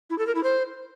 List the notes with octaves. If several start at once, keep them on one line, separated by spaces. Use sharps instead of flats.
E4
A4
A#4
E4
C5